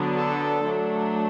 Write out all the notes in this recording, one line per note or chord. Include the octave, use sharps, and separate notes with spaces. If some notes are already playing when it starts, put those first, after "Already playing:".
Already playing: D3 F#3 B3 D4
A4
F#3 A3 D4